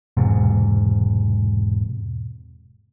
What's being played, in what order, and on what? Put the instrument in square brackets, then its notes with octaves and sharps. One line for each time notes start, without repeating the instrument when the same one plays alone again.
[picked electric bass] E1 G#2 C3